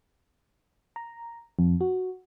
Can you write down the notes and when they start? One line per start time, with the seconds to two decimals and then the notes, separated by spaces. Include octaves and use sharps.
0.96 A#5
1.59 F2
1.81 F#4